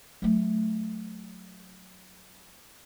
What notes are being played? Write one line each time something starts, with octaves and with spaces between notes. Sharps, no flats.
F#3 A3